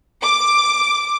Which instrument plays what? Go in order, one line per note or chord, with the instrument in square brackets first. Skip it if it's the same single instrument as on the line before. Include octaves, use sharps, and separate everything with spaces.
[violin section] D6